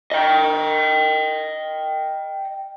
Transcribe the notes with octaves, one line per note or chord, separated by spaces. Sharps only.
D#5 G5